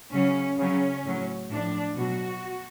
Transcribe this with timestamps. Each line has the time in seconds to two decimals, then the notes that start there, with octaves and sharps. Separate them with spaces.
0.13 C#3 F#3 C#4
0.58 C#3 F#3 C#4
1.04 A2 F#3
1.50 A2 F3 D4
1.95 B2 F#3 F#4